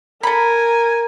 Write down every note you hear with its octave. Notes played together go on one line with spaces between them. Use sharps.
A4 A#4 G#5 A#5 B5